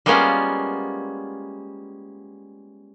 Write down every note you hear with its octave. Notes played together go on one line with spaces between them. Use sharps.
G3 G#3 A#3 B3 C#4 F4